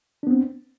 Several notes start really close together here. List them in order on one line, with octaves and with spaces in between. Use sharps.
D4 B3 C4